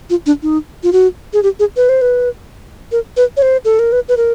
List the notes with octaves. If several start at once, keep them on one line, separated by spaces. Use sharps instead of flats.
F4
D4
D#4
F4
F#4
G#4
G4
G#4
B4
C5
B4
A#4
B4
C#5
C5
A4
A#4
B4
B4
A#4